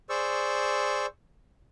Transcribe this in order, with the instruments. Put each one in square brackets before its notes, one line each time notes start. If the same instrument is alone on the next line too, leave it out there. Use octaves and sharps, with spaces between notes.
[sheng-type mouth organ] G#4 C5 D5 C#6 E6